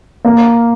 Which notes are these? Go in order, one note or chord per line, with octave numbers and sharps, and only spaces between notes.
A#3